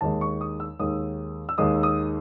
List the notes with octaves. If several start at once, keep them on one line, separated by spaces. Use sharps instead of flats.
D#2 D#3 G#3 A5
C#6
D#6
E6
D#2 D#3 G#3 D#6
E6
D#2 D#3 G#3 D#6
D#6